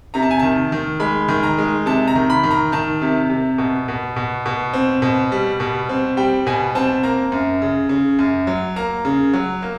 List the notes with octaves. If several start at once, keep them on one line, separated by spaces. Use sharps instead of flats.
C3 A#5
A5
G#5
D#3 A5
D#3
G#3 B5
D#3
A#5
G#3
C3 A5
A#5
D#3
B5
D#3
A#5
D#3 A5
C3
C3
B2
B2
B2
B2
C4
B2
G3
B2
C4
G3 G5
B2 G#5
C4 A5
A#3 A#5
F#2
C#3
C#3
F#2
F#3
A#3 A#5
C#3
F#3
A#3